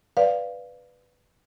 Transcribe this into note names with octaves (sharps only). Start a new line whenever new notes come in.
B4 D5 F5